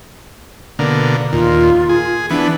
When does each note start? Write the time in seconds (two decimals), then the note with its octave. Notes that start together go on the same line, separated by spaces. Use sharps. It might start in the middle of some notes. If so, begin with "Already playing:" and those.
0.79 B2 D3 A#3
1.32 D#2 A#2 F4
1.89 G#4
2.30 E3 B3 D4